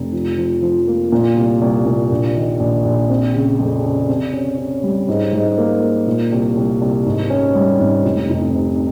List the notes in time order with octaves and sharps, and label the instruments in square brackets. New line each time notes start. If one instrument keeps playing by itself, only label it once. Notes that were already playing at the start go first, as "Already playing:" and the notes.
Already playing: [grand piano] F1
F3
F3
F3
A#3
A#2
C2
C2
A#2
A#1
D#3
A#1
A#1
C4
C#3
F2
C#3
C3
C#4
C#4
G3
G#2
G#2
A#3
A#3
A#2
C2
C2
C2
G#1
C#4
G3
G#1
F1
F1
C3